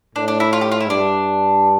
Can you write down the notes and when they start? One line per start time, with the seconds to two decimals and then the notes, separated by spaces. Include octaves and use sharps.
0.15 A2 D4
0.28 D4
0.40 E4
0.53 F4
0.61 G4
0.71 F4
0.80 E4
0.89 G2 D4